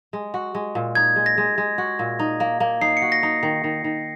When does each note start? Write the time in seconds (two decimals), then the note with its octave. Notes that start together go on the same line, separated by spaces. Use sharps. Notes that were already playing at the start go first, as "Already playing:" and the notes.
0.13 G#3
0.34 F#4
0.55 G#3
0.75 A#2
0.95 D#4 G#6
1.16 G#3
1.26 A#6
1.38 G#3
1.58 G#3
1.78 F#4
1.99 A#2
2.19 D#4
2.40 A#3
2.60 A#3
2.81 D#4 C7
2.97 C#7
3.02 F#4
3.12 A#6
3.23 D#4
3.43 D#3
3.64 D#3
3.84 D#3